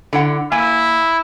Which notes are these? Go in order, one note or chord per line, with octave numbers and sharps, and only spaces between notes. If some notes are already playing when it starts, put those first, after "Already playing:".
D3 E4 F#5
A#3 E4 G#5